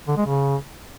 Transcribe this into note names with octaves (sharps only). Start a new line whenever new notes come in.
D3
G#3
C#3